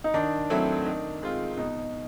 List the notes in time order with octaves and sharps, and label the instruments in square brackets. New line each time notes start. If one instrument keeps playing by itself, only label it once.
[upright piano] D#4
[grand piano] D#3 [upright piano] D4
[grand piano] F#3 A3 C4 E4
D#3
G#3 C4 F4
[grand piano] B2 [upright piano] D#4